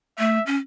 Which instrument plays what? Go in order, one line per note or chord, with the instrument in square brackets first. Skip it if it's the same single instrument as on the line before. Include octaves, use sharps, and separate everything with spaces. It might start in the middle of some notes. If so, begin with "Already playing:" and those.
[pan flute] A3 [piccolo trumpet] E5
[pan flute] C#4